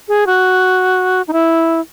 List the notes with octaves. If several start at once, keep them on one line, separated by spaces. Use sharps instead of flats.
G#4
F#4
D#4
E4